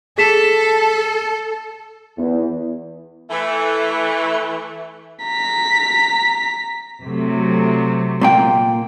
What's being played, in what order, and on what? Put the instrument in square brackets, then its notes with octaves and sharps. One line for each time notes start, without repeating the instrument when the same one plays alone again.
[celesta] G#4 B6 E7 [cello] A4
[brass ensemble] E2
[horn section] E3 A3
[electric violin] A#5 B6
[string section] C3 F#3 A3
[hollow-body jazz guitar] A#2 A#3 G5